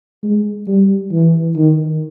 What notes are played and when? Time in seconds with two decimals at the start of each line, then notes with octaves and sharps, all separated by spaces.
0.23 G#3
0.67 G3
1.13 E3
1.57 D#3